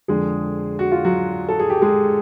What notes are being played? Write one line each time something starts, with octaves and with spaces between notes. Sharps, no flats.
F2 D3 F3 G#3 G#4
F#4
F4
F#3 F#4
A4
G#4
G4
G#3 G#4